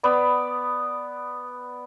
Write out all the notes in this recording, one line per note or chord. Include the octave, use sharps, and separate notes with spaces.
B3 D5 B5